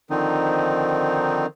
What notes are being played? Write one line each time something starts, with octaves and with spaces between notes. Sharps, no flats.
D3 D#3 F3 C4 D#4